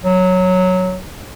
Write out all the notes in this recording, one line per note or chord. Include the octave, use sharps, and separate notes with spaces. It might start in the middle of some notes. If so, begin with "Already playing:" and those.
F#3